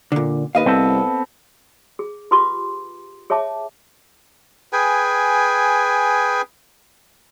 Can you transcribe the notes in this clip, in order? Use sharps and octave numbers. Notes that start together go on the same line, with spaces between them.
A#2 D3
D#2 B4 D#5 F5
C2 B3 C4 A4
G#4
F4 G4 B4 C6 D6
G#4 C#5 E5 A5 D6
G#4 B4 G5 G#5